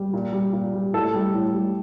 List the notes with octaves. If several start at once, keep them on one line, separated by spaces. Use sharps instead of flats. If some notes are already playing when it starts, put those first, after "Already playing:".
Already playing: G3
A#2
G3
A#2
G3
A2 A4
G3
A2
G3